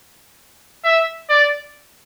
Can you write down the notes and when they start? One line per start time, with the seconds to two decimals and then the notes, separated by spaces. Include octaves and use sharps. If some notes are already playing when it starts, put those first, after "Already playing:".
0.84 E5
1.30 D5